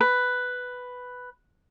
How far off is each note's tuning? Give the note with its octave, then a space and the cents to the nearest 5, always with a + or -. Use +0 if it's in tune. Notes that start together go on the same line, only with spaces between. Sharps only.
B4 +5